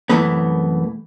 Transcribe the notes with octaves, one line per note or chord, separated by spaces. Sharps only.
C2 F#2 E3 A3 B3